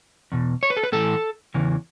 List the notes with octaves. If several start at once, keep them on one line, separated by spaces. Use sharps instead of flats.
E2 B2
C#5
B4
A4
B4
A2 E3 A4
E2 C#3 E3